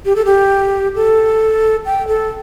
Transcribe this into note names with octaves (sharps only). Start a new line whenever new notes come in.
G4
A4
G4
A4
G5
A4